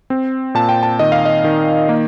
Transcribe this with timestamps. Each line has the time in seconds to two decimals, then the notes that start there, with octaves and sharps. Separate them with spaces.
0.10 C4
0.55 A#2 A5
0.69 G5
0.83 A5
0.99 D#3 D#5
1.12 F5
1.25 D#5
1.44 D#3
1.89 A#3